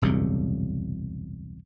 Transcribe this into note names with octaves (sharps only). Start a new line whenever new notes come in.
E1 C2 F#2 C#3